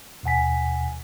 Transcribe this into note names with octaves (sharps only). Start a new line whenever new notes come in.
D#2 B2 F#5 G#5 B6